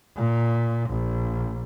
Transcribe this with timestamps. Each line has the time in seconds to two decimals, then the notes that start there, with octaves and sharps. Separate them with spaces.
0.16 A#2
0.90 A#1